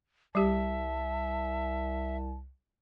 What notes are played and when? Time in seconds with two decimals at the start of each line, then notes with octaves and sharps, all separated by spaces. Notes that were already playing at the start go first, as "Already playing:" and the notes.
0.35 C2 G3 G4 E5 A5